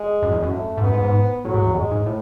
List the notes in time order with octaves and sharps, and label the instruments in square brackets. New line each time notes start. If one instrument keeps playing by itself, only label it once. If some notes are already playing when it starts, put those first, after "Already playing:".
Already playing: [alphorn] G#3
[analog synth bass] F#2
E2
F#2
[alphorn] A3
[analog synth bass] G#2
[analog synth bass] F#2 [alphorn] B3
[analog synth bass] G#2
G#2
[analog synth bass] A2 [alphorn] F#3
[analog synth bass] G#2
E2
[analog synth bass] F#2 [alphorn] G#3
[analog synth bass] G#2
A2